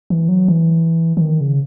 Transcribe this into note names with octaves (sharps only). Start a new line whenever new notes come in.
E3
F#3
E3
E3
D#3
C#3